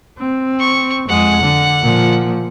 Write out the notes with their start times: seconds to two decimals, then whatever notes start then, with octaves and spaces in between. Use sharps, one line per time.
0.19 C4
0.60 C#6
1.09 F2 G#3 F#5
1.43 D3
1.82 A#2 F3